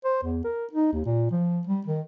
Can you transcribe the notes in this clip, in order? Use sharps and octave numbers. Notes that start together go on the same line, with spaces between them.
C5
E2
A#4
D#4
D#2
A#2
F3
G3
D#3